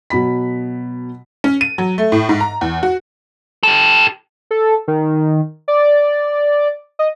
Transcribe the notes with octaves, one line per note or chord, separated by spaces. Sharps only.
B2 F#3 B5 B6
C#4
D#7
F#3
A3
A2
G#2
A#5
E2
F#4
G4 A4
A4
D#3
D5
D#5